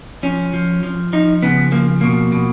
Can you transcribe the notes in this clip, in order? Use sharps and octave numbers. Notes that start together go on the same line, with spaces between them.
F3 C#4
F3
F3
F3 D#4
C#3 B3
F3 A#3
B2 A#3
B2